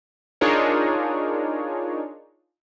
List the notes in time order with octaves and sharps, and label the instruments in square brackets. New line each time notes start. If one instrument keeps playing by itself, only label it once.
[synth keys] D4 D#4 F4 G#4 A#4 C#5